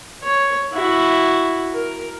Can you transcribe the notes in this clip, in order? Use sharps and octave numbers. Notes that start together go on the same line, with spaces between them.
C#5
E4 F#4
A#4